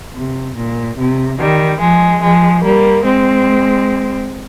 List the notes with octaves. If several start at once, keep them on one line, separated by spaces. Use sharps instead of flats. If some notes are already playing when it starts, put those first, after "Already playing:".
C3
A#2
C3
D#3 G3
F3 G#3
F3 G#3
G3 A#3
G#3 C4